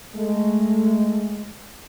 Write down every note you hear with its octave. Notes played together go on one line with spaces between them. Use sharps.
G#3 A3